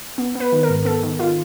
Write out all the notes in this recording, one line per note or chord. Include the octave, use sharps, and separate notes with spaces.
B3
B3
B4
D#3
A#4
G#2
B3 A4
D#3
D#3 F4